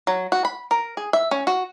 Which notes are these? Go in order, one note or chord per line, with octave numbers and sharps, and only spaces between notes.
F#3
F#4
B5
A#4
G#4
E5
C#4
F#4